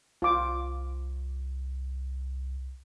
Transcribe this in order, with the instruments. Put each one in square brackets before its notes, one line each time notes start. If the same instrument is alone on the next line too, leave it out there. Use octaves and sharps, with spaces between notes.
[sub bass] C2 [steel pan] F4 D6